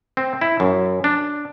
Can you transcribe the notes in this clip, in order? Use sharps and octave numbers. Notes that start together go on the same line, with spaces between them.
C4
E4
F#2
D4